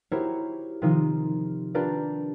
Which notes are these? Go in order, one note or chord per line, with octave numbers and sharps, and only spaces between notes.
E4 F#4 G4 A#4 C5 C#5
C3 D#3 F3 D#4 F4
D4 F4 G4 A#4 B4 D5